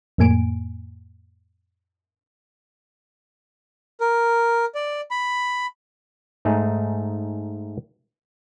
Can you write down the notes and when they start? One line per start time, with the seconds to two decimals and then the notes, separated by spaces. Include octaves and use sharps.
0.18 F2 A2 A#3 G#5 D7
4.00 A#4
4.75 D5
5.11 B5
6.45 G#2 A3 D#4 G#4